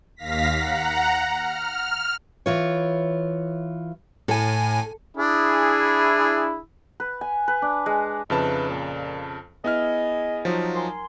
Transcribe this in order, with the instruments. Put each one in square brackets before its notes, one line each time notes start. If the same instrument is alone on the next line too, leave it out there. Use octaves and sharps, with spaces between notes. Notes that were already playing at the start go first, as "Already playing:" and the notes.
[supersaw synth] D#2 F5 A#6 B6
F#5 A#5
F6
[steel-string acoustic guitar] E3 F4 C#5
[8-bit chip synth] A2 G#5 [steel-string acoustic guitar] A4
[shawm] D4 [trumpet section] E4 G#4
[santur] B4
G#5
B4
D4
G#3
[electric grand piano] F2 C#3 A5 [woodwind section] D#4 E4 B4
[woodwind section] A#2
[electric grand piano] B3 E4 F6 [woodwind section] G#4 D#5
[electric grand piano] F3 F#3 D#4
[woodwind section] A#4 G#5 C6